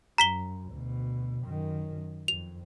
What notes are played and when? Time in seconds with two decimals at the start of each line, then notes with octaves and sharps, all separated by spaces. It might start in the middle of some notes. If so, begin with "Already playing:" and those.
0.18 F#2 A#5 B6 G7
0.72 D2 B2
1.42 F#2 D#3
2.28 F2 F7